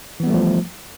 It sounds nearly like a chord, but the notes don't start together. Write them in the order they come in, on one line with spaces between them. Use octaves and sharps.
E3 B3 G3 A3 F3